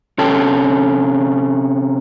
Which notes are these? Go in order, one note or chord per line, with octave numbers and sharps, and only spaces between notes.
C3 C#4 A4 C#5 G5 A5